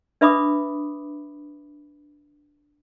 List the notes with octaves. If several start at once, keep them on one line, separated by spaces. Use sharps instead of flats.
D4 B4 E5 B5 D6 D#6